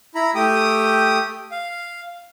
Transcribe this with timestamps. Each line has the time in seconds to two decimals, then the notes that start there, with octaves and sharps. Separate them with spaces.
0.15 E4 A#5 B5
0.35 A3 G4 G5 D#6
1.51 F5